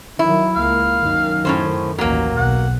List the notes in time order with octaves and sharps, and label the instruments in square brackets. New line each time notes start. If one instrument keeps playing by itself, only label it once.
[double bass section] D#3 F#3 [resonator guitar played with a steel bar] E4
[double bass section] C#2 A#3 [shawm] F5
[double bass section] F#2 D#3
[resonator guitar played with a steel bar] A2 C#4 C5
[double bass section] A1 D#2 [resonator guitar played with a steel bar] F#3 A#3
[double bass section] B1 [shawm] F#5